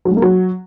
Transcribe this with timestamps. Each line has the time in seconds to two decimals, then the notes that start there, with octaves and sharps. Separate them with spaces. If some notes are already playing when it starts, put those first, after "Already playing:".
0.05 F#3
0.11 G#3
0.17 A#3
0.22 F#3